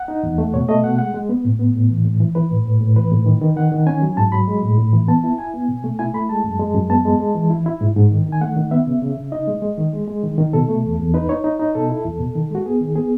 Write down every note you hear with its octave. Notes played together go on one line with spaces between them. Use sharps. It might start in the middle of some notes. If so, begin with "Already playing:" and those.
Already playing: F#5
D#4
E2
A3
B2 C#5
A3 D#5
B2 F#5
G#3 F#5
G#3
B3
A2
B3
A2
E3
A2
E3
E3 B4
A2
A2
A2
E3 B4
A2
D#3
D#3
D#3 F#5
D#3
C#4 G#5
F#3
G#2 A5
F#3 B5
G#3
A2
A2
E3
B3 A5
E4
E4 G#5
B3
B2
A3
E4 G#5
A3 B5
G#3 A5
F#2
G#3
F#2
B3 A5
G#3
G#3
E3
E4
E4
G#2
G#2
D#3
D#3
G#5
A3 F#5
D#3
B3 E5
C#3
C#3
C#3
D#4 D#5
G#3
G#3
D#3
G#3
G#3
D#3
D#3
B2 A4
A3
E2
E2
D#4 B4
D#4 C#5
D#4
D#4
B2 A4
E4
E2
B2
D#3
G#3 F#4
B3 G#4
D#3
B3 G#4